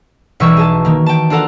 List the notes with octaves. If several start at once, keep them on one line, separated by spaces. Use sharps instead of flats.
B1 B2 E3 G3 C#6 E6
G#4 A5
D#3 A#3
G5 A5
D4 F4 A4 A#4 F#5